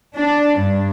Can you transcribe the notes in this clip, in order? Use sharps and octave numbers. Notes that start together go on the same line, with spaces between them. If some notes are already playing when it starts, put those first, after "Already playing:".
D4
G2